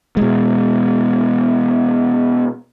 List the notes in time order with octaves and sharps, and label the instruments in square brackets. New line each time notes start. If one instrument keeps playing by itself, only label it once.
[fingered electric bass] B2 G#3